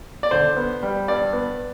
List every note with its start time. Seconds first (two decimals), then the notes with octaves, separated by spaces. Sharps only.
0.23 D5
0.31 D3 C5
0.57 B3
0.83 G3
1.08 G2 D5
1.33 B3